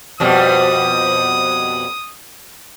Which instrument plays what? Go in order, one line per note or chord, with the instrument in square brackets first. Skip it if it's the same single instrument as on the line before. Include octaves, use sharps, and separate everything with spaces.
[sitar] F2 B2 G3 [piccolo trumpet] D#6